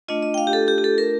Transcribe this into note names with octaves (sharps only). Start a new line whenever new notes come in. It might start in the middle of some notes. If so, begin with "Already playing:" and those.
A3 D4 F4 D#5
D#5
G5
F5
G4
A4
G4
G4
A4
A#4